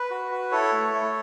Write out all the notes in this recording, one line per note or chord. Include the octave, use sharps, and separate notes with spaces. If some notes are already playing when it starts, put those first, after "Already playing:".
Already playing: B4
F#4
F#4
E4 A4 C#5
A3
A3